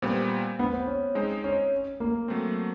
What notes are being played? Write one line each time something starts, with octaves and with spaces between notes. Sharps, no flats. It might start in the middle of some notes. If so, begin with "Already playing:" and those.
A#2 G3 B3 C4
B3
C4
C#4
G#3 C4 D#4 G#4 C5
C#4
A#3
F#3 A3 C4